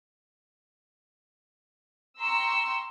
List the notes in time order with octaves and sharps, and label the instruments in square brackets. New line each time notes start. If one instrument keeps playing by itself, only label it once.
[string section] G5 A#5 C6 C#6 E6